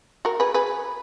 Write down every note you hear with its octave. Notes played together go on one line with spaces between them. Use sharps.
F#4 A#4
G#4 B4
G#4 B4